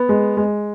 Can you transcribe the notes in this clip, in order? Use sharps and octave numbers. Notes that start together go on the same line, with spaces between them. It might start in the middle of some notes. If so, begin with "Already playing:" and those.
Already playing: B3
G#3
G#3